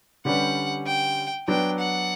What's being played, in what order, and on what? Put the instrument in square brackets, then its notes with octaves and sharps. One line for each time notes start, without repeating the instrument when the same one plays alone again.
[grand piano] D3 G3 C#4 G4 B4 [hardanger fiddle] F#5
[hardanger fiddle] G5
[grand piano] F#3 B3 D4 [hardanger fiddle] G5
[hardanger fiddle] F#5